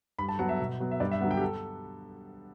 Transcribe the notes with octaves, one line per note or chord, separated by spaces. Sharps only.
G2 B5
A5
F#3 B3 F#5
E5
B2
F#3 B3
E5
G2 D5
E5
D3 F#3 B3 F#5
G5
G4
A4